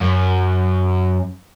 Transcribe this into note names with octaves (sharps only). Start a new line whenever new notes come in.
F#2